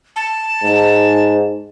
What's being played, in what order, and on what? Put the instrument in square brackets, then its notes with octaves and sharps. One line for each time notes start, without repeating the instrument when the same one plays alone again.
[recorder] A5
[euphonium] G#2